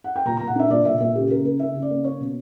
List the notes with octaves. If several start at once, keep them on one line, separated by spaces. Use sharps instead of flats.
F#5
G5
A#2 A#5
A#5
A#2
F#5
D4 E5
A#2 D5
A#2 E5
A#2 E5
C#3 G4
C#3 A#4
A#3 A#4
C#3 E5
C#3
D5
A#3
C#4 C#5
B2